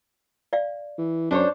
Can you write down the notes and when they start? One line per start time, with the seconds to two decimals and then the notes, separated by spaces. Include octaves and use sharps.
0.53 D5 F5
0.98 E3
1.31 F#2 D4 C5 C#5